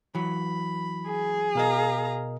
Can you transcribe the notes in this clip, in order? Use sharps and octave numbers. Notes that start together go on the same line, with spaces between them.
E3 F#3 B5
G#4
B2 A#4 D#5 F5 A#5